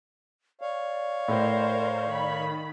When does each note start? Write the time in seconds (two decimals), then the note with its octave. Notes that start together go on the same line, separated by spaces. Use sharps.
0.61 C#5 D5 F5
1.28 A2 A#4 C5
2.09 D#3 B5